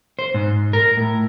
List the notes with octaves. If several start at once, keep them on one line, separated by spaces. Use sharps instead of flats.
C5
G#2
A#4
A2